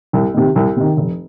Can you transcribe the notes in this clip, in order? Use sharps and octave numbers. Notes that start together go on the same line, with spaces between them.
C2
C3 D#3
C2
C3 D#3
F1